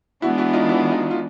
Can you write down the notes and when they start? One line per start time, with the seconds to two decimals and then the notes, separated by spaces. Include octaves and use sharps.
0.22 E3 G#3 B3 D4 E4 F#4
0.38 E4 F#4
0.53 D#4 F4
0.69 E4 F#4
0.91 D#4 F4
1.11 F4